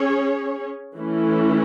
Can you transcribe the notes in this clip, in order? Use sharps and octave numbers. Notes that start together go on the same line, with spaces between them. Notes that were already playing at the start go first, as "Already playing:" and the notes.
Already playing: C#4 G#4 C#5
E3 A3 C#4 E4